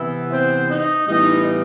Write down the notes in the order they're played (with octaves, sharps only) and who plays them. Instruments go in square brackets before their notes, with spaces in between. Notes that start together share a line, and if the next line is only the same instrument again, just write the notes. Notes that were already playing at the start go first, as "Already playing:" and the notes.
Already playing: [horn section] C3 E3 B3 E4 E5
C4 C5
D#4 D#5
A2 E3 G3 B3 D#4 D#5